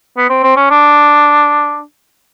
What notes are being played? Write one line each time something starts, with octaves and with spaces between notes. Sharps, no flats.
B3
C4
C4
C#4
D4